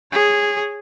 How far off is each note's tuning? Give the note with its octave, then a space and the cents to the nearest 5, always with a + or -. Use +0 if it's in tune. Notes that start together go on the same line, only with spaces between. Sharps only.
G#4 -10 C#5 +0